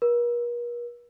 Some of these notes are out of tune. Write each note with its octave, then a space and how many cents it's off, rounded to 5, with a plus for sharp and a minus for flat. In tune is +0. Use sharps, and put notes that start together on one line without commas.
A#4 +45